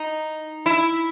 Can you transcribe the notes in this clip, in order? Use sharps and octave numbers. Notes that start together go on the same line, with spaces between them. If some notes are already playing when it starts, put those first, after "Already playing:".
Already playing: D#4
E4